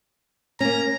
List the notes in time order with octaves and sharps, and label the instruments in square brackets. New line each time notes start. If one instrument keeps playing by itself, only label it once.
[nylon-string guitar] A#3 C#4 [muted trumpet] A#5